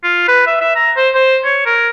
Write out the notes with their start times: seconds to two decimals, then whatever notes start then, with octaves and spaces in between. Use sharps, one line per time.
0.03 F4
0.28 B4
0.47 E5
0.61 E5
0.76 A#5
0.97 C5
1.15 C5
1.45 C#5
1.66 A#4